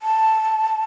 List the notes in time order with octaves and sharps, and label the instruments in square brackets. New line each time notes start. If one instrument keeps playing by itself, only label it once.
[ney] A5